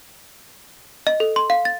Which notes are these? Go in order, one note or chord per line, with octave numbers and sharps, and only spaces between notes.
D#5
A4
C6
F5
A6